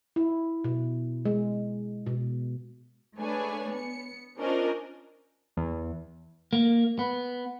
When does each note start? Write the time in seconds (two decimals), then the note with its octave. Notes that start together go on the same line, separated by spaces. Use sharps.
0.16 E4
0.64 B2
1.25 G#3
2.06 B2
3.19 A3 D4 G#4 B4 C#5 G#5
3.70 B3 C#7
4.37 C#4 D4 F4 A#4 C5 D#5
5.57 E2
6.53 A#3
6.99 B3